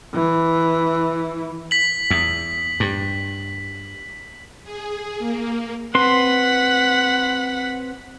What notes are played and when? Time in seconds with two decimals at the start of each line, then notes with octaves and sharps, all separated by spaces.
0.14 E3
1.71 B6 F#7
2.10 E2
2.80 G2
4.63 G#4
5.19 A#3
5.95 C4 B4 F#5 C6 B6